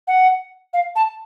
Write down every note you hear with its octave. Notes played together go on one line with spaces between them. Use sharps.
F#5
F5
A5